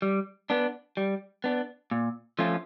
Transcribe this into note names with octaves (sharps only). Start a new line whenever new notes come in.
G3
B3 D4
G3
B3 D4
A#2
F3 A3 C#4 F4